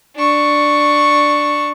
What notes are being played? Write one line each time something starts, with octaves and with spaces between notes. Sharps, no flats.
D4 C#6